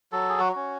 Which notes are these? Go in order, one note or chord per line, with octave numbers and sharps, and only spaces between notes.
F#3 A4
G#4
F#4
C#4 F#4